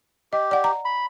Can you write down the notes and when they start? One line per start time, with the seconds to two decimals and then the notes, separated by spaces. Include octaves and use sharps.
0.33 G4 D#5
0.51 D5 F#5
0.64 A#5
0.85 B5